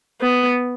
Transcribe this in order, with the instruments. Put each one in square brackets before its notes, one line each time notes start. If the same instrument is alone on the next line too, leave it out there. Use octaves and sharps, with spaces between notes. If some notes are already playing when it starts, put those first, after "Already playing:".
[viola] B3